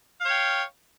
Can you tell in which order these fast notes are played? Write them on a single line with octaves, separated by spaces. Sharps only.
F5 C#5 G5